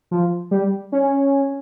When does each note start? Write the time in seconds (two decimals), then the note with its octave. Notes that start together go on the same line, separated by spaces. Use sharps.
0.11 F3
0.51 G3
0.92 C#4